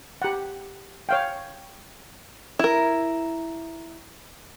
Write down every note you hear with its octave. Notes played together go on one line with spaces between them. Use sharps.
G4 F#5
C#5 F5 G5
E4 A#4